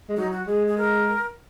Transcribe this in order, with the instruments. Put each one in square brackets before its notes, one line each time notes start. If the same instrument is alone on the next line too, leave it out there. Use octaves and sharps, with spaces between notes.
[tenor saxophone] G#3
[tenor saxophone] F#3 [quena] D#4
[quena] F#4
[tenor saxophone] G#3 [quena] G#4
[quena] G#4
A#4